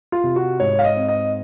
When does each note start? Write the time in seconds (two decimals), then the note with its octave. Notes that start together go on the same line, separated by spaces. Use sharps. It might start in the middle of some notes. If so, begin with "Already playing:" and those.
0.12 F4
0.24 C3
0.36 F#4
0.60 G#2 C#5
0.79 F5
0.84 D#5
0.96 C4
1.08 D#5